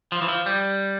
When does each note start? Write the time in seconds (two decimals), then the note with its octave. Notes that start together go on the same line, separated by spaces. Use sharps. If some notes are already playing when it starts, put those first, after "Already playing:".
0.12 F3
0.22 E3
0.28 F3
0.46 G3